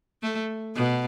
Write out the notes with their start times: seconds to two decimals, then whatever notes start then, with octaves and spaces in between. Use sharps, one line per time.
0.22 A3
0.75 B2